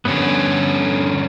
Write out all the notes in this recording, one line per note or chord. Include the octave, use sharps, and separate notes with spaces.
G2 D3 B3 C#4